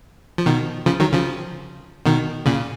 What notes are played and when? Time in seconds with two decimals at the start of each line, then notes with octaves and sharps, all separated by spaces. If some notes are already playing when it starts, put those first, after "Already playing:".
0.38 F3
0.46 B2 D#3
0.86 C#3 F3
1.00 D#3 F#3
1.13 C#3 F3
2.06 B2 D#3
2.46 A#2 C#3